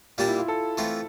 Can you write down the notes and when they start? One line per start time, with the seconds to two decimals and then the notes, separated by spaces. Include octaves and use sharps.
0.18 A#2 G3 A#3 D4 F4 G4
0.28 E4
0.38 F4
0.48 A4
0.78 E3 A3 C4 F4